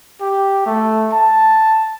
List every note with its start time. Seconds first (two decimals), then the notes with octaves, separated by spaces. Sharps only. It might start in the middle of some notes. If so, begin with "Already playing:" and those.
0.21 G4
0.66 A3
1.13 A5